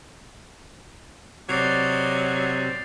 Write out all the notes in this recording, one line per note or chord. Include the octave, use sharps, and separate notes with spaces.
C3 F#3 D5 D#5 A6 C7 F7